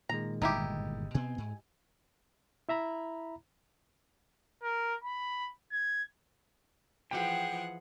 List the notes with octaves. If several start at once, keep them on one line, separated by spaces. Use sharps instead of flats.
A#2 D#3 G#3 A#5
G1 G#2 D#4 E4 G4
B2 B3 C4 G#5
G#2
E4 E5 A#5 B5
A#4
B5
G#6
E3 F3 G#4 F#5 G5